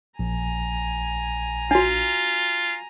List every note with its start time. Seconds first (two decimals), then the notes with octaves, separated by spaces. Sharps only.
0.19 A#1 G#5 A#5
1.71 D4 F4 F#4